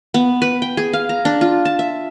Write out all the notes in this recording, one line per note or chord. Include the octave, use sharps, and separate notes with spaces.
B3
B4
G5
G#4
F5
A#5
D4
F4
A5
E5